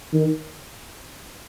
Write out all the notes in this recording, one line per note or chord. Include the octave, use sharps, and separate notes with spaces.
D#3